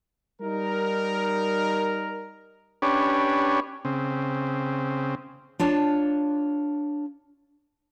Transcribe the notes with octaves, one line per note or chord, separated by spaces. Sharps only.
G3 D#4 A#4
C#4 D4 G4 B4 C#5
C#3 C4
D4 F4 C#5 A5